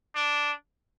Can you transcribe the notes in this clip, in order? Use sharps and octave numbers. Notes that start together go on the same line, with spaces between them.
D4